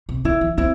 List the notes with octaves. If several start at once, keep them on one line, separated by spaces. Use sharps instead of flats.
C3
D3 E4
E3
C4 E4